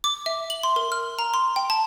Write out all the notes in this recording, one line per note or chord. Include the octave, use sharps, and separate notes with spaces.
D6
E5
F#7
C6
A#4
F6
A#5
C6
G5
A5